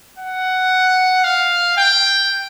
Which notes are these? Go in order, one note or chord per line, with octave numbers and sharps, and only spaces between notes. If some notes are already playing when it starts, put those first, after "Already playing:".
F#5
F5
G5